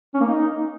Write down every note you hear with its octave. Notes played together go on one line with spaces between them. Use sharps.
C#4
A#3
D#4